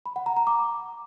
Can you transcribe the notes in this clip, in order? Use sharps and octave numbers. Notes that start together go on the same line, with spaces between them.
B5
F#5
A#5
A#5
D6